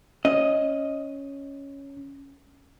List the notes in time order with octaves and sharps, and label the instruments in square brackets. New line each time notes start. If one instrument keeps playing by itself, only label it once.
[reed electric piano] C#4 [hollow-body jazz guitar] D#5